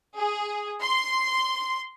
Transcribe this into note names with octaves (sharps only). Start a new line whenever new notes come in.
G#4
C6